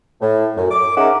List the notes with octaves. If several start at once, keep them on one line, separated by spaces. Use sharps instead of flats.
A2
F#2
D6
C#4 D#4 G#4 A#4 E5 F#5